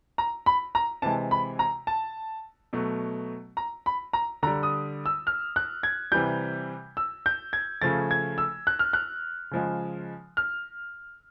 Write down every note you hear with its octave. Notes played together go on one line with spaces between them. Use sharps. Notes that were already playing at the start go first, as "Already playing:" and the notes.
A#5
B5
A#5
C3 E3 G#3 A5
B5
A#5
A5
B2 F#3 A3
A#5
B5
A#5
D3 G3 A#5
D#6
E6
F6
F#6
G#6
C3 E3 G3 G6
E6
G6
G#6
C#3 F3 A3 A6
G#6
E6
F#6
F6
F#6
C#3 F3 G#3
F6